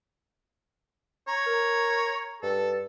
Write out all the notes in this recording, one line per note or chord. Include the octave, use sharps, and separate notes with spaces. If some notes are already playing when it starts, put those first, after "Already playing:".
C#5 A#5
A#4
G2 A4